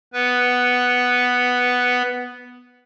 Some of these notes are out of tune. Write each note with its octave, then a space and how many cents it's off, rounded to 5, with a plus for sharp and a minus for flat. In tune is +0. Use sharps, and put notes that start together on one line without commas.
B3 +0 B4 +0